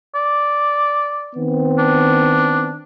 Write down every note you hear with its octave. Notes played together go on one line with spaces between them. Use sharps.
D5
D#3 B3 C4
D4